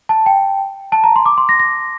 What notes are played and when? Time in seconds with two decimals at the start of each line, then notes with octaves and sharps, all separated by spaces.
0.09 A5
0.26 G5
0.92 A5
1.04 A#5
1.16 C6
1.26 D6
1.38 C6
1.49 A#6
1.60 A#6